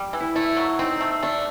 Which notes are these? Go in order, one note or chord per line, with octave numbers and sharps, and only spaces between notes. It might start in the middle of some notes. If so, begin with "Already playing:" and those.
Already playing: G3
E3
E4
A3 E4
F#3
C4 D#4
A3
A3 D4